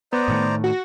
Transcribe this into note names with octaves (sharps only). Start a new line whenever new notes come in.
B3 C5 D5 A#5
A2 D#3 A3
F#4